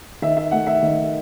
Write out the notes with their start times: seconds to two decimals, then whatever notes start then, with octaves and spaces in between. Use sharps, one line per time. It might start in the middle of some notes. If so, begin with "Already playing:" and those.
0.22 D#3 E5
0.37 E5
0.51 A3 F#5
0.67 E5
0.83 D#3